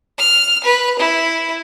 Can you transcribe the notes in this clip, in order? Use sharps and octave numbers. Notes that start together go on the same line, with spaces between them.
F6
B4
E4